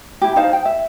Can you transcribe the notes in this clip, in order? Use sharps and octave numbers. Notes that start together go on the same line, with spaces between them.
E4 G4
D#4 C5 F5 A5
G5
E5